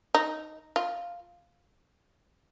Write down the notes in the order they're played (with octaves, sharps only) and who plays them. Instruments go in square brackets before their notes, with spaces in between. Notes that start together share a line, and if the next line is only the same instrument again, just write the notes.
[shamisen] D#4
F4